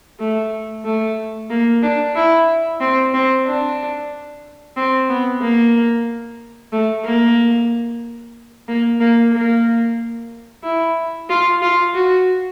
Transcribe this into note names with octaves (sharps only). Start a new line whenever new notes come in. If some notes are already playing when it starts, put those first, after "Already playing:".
A3
A3
A#3
D4
E4
C4
C4
D4
C4
B3
A#3
A3
A#3
A#3
A#3
A#3
E4
F4
F4
F#4